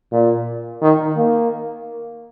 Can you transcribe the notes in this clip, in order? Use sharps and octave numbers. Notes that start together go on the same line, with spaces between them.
A#2
D#3
A#3